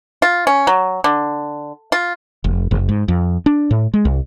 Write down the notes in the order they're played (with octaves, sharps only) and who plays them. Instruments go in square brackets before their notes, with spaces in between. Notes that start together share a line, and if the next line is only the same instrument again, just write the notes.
[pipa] F4
C#4
F#3
D3
F4
[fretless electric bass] F1
F#1
G#2
F2
D4
A2
G#3
C2